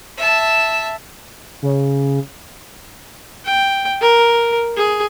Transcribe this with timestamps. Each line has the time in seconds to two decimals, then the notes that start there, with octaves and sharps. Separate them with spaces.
0.17 E5 A5
1.62 C#3
3.45 G5
4.01 A#4
4.77 G#4